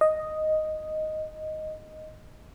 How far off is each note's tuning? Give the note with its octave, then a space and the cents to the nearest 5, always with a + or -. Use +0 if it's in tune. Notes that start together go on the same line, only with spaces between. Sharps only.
D#5 +0